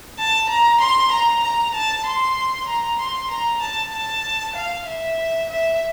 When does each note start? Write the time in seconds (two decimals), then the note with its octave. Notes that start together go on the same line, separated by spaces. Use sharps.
0.18 A5
0.49 A#5
0.81 C6
1.12 A#5
1.43 A#5
1.74 A5
2.06 C6
2.68 A#5
2.99 C6
3.30 A#5
3.62 A5
3.93 A5
4.55 F5
4.86 E5
5.49 E5